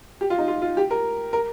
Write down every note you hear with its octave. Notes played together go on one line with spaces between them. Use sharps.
G4
F4
D#4
F4
F4
G4
A#4
A#4